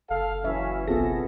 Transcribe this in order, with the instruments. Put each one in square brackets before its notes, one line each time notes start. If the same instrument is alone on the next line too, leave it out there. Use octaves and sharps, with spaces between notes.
[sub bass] F#1 [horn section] A4 F5
[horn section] E3 F#3 C#4 [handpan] E5
[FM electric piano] B1 F4 A#6 [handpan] B3 G#4 [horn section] C4 A4